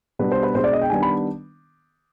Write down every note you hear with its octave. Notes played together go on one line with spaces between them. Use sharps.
B2 G3 B3 D4 B4
C5
B4
B2 G#3 D4 C5
D5
D#5
G5
D#3 G3 B3 D4 G#5
B5